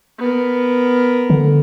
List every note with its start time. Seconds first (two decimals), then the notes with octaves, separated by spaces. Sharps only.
0.18 B3 A#4
1.30 D3